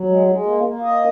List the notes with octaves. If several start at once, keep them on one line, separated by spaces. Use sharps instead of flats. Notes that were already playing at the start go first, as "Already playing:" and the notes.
Already playing: F#3
G#3
G#3
A#3
A#3
D#5